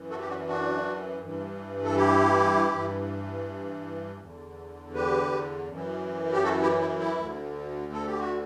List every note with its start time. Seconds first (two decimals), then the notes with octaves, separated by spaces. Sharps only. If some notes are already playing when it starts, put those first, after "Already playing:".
Already playing: F#2 E3
0.10 F#4 A4
0.20 G4
0.29 D4 F#4
0.47 D4 F#4
1.22 G2 E3
1.84 A4
1.96 E4 G4
2.71 G2 E3
4.20 E2 D3
4.94 G4 B4
5.68 F#2 E3
6.32 G4
6.44 F#4 A4
6.62 E4 G4
6.80 E4
6.99 E4
7.17 D2 D3
7.92 A4
8.07 G4
8.19 F#4